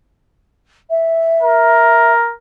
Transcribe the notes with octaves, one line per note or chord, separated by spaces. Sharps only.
E5
A#4